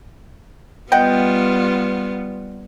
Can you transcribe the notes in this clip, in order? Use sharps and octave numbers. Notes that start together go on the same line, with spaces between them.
G3 B3 F4 D#5 F#5 G5